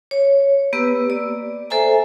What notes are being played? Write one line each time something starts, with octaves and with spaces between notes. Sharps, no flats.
C#5
A#3 B3 G4 B4 E6
D5
A4 C5 E5 G#5 A#5